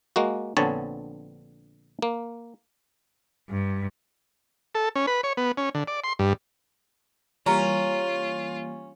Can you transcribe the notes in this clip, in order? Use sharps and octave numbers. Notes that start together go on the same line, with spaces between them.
G#3 A#3 F#4
A#1 D3 B3 C4 C#5 A5
A#3
G2
A4
C#4
B4
C#5
B3
C#4
D3
D5
C6
G2
E3 G3 A#3 C#4 F4 A#5